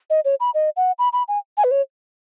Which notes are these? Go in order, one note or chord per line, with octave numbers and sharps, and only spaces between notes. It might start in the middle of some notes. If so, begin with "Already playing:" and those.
D#5
C#5
B5
D#5
F#5
B5
B5
G#5
G#5
B4
C#5